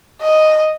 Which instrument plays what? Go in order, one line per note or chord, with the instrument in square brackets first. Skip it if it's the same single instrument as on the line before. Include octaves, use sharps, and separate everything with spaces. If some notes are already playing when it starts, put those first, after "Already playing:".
[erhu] D#5